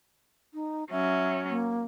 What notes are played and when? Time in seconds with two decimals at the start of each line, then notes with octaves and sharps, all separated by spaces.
0.54 D#4
0.91 F#3 C#4 E5
1.50 A#3